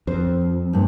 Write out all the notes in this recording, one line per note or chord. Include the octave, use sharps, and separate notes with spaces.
F2 C5
G2 A#2 C5